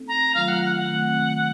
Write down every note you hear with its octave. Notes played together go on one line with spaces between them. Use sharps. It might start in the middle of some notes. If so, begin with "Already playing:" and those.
Already playing: A3 C4 D#4 A4
A#5
D#3 F#3 A3 C4 F4 F5
F#5
F#5
F#5
C3 D#3 A3 C4